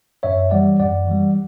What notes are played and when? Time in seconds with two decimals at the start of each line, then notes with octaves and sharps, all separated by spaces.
0.23 F#2 C#5 E5
0.51 E3 G3 D5 F#5
0.80 F#2 D5 F#5
1.07 E3 G3